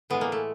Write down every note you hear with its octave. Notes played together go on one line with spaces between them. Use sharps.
A2 E3 G#3 B3
A#3
A3